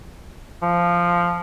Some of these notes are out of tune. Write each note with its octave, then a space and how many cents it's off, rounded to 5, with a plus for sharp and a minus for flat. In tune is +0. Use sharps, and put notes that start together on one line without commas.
F3 -5